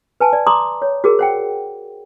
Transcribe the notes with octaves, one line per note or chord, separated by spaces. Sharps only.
B4 G#5 A5
D5
A#5 C6 D6 D#6
C#5
F#4 G#4 A#4
C5 F#5 G5